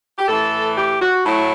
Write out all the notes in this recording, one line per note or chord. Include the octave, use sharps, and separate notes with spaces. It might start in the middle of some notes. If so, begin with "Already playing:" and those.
G4
A2 E3 A4
G4
F#4
A2 F#3 E4